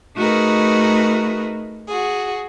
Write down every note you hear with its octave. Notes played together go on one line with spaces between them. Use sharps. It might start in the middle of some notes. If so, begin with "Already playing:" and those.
A3 D#4 F#4 G#4 A#4 B4
F#4 G#4